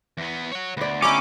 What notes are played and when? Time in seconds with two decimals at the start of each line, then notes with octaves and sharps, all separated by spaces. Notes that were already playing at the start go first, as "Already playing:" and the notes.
0.17 E2 B3
0.52 C#5 F#5
0.77 D2 B3 D5
1.02 C#4 D#4 E4 G4 D6